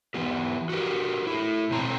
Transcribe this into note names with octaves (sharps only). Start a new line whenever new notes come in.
E3 B3 G4
F#4 G4 A#4
A3 E4
B2 D3 C4 A5 A#5